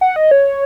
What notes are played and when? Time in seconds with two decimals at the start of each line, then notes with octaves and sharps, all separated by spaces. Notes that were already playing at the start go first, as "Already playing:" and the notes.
0.01 F#5
0.16 D#5
0.31 C#5